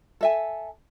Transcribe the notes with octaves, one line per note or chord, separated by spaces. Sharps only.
A4 E5 G#5